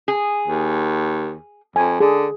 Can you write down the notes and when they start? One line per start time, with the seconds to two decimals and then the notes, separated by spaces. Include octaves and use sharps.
0.08 G#4
0.47 D#2
1.76 F2 G#5
2.00 D3 G#4